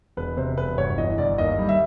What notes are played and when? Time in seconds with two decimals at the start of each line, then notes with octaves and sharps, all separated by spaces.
0.17 E1 B4
0.37 C3 C5
0.58 E1 B4
0.78 G1 C#5
0.98 E3 D#5
1.18 G1 D5
1.38 D#2 D#5
1.59 G3
1.69 E5